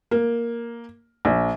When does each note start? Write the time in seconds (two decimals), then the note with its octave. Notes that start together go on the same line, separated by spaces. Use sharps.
0.11 A#3
1.25 A#1